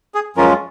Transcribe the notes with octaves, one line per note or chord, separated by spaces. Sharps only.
G#4
F#2 F3 G#3 C#4 F4 A#4